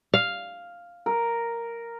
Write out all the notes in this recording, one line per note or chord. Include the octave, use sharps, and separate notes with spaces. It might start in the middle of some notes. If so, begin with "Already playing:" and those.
F5
A#4